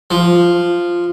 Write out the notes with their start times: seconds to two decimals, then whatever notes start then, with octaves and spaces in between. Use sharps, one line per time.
0.11 F3